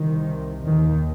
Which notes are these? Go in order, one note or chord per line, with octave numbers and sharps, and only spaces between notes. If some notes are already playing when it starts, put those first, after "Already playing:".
Already playing: C2 C3 D#3
D#2 D#3